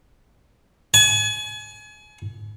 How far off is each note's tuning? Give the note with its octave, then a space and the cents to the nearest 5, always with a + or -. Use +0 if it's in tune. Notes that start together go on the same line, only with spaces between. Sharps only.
G#5 +35